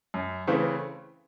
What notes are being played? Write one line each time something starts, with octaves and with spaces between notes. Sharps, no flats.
F#2
C#3 E3 A3 C4